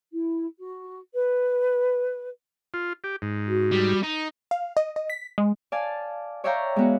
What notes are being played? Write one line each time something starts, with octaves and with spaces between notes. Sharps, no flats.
E4
F#4
B4
F4
G4
G#2
F#4
G3
D#4
F5
D#5
D#5
B6
G#3
D5 F5 G#5 A5
C#5 D5 E5 F5 G5 A#5
G#3 B3 F#4